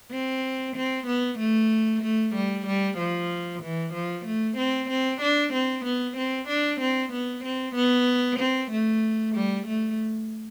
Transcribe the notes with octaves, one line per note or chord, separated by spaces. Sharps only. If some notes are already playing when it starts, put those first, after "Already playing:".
C4
C4
B3
A3
A3
G3
G3
F3
E3
F3
A3
C4
C4
D4
C4
B3
C4
D4
C4
B3
C4
B3
C4
A3
G3
A3